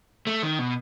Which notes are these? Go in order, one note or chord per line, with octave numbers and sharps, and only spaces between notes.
A3
D#3
B2